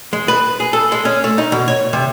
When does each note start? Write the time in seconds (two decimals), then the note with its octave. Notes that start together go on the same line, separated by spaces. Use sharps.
0.13 G#3
0.28 B4
0.60 G#4
0.73 A4
0.92 G#3
1.05 C#4
1.24 A3
1.38 D#4
1.52 B2
1.68 C#5
1.93 C3